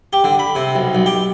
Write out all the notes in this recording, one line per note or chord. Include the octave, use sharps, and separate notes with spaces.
G4
D3
B5
C3
B1
B1
G4